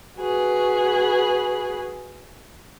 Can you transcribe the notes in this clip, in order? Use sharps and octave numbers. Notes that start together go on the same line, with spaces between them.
F#4 G#4 B4